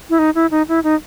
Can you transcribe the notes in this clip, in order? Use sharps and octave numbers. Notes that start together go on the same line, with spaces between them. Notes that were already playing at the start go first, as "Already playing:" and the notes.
E4
D#4
E4
D#4
E4
D#4